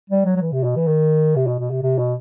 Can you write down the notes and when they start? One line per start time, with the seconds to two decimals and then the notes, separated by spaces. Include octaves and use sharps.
0.10 G3
0.25 F#3
0.36 F#3
0.41 E3
0.52 C3
0.64 B2
0.76 E3
0.87 D#3
1.36 C3
1.47 B2
1.59 B2
1.71 C3
1.83 C3
1.98 B2